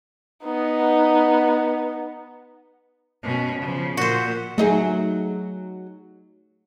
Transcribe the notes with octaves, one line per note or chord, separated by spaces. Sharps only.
B3 D#4
B2 C#4
C#3 F3
A#2 F#4 C5
F#3 A3 D#4 G#4